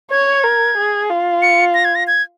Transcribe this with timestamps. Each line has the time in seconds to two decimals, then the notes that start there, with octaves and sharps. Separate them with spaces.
0.11 C#5 G#6
0.44 A#4
0.78 G#4
1.10 F4
1.42 C#7
1.74 A#6
1.85 G#6
1.95 A#6
2.07 G#6